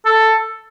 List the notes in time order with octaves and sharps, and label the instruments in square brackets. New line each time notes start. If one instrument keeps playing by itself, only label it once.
[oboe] A4